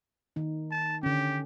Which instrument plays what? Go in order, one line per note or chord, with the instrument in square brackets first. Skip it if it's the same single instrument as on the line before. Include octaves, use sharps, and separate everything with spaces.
[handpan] D#3 D#4
[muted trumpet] A5
[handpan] D3 C#4 [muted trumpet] G4